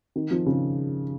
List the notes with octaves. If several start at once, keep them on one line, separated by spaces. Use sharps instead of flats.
D#3
F3
C#3